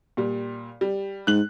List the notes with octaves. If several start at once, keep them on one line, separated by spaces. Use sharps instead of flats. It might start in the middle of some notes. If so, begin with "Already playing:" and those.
A#2 G3
G3
G#2 F#6 F#7